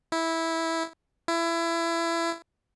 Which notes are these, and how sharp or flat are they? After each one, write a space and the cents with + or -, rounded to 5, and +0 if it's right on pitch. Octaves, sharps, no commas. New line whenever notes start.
E4 -10
E4 +25